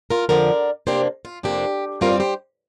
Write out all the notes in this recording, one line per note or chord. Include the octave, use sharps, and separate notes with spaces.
F4 A#4
F2 D3 F3 A#4 D5
F2 C3 A#3 D4 G4 C5
F4
F2 C3 A#3 D4 G4
G2 G3 C4 F4 A#4
D5
G4 C5